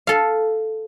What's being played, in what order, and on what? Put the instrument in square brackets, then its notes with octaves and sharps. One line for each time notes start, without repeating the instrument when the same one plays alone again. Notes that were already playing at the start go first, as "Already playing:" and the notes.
[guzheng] A4 F5